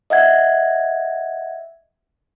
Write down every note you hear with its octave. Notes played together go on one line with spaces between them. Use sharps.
D#5 E5 F#5 G#6